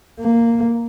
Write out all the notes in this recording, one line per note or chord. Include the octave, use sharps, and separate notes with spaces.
A#3